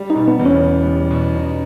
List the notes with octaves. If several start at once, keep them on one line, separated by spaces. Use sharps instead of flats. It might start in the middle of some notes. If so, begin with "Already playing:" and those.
Already playing: G3
D#4
B2
B3
E2
C#4
B3
G3
B2
D#4